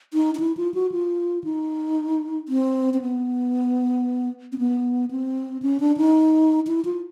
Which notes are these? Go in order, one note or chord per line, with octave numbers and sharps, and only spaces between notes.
D#4
D#4
E4
F4
F#4
F4
D#4
C4
C4
B3
C4
B3
C4
C#4
D4
D#4
E4
F4